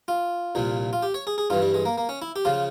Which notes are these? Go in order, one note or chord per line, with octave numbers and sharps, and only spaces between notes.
F4
C2 A#2 F3
F4
G4
C#5
G#4
G#4
G2 E3 F4
G3
G#3
A#3
A#3
C#4
E4
G4
C#3 F3 F4